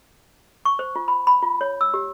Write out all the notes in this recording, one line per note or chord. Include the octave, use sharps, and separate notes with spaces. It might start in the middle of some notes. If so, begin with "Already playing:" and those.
C#6
C5
F4
B5
B5
F4
C#5
E6
G4